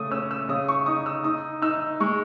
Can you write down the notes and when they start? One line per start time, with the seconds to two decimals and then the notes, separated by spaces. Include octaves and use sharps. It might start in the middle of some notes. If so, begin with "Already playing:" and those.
Already playing: C#3 A3 D#6
0.11 C#4 E6
0.31 E6
0.49 C#3 D#6
0.68 C#6
0.86 D#4 D#6
1.06 E6
1.24 D#4 D#6
1.62 D#4 E6
2.00 G#3 C#6